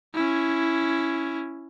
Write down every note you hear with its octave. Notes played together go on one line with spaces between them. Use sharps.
C#4 E4